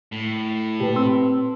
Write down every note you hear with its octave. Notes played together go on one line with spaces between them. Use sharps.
A2
A#2 G4 B4 A5
C4 C6 E6